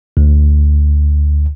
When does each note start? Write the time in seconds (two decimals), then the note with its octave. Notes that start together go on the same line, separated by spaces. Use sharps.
0.17 D2